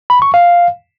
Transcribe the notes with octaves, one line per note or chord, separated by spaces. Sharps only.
B5
C#6
F5